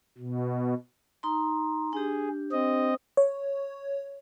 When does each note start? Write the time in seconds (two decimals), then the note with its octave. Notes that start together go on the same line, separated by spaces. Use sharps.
0.18 B2
1.23 D#4 A#5 C6
1.93 D4 G4 G#4
2.52 C4 D#5
3.17 C#5